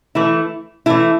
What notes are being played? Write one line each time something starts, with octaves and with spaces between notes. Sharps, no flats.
E3 A3 E4
E3 A3 E4